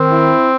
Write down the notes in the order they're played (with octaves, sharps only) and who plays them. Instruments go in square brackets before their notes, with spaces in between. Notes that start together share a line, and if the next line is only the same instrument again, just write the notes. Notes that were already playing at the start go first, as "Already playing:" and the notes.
Already playing: [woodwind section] D#3 [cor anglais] C4
[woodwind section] E4